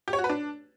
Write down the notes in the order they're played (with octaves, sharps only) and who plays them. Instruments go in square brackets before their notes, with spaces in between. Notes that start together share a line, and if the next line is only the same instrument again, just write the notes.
[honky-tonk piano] G4
C#5
F#4
B4
D4